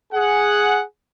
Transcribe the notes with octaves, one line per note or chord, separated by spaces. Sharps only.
G#4 F#5